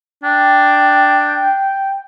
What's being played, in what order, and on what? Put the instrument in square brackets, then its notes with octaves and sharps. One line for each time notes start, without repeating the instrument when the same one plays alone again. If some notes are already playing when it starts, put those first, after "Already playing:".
[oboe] D4 [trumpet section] G5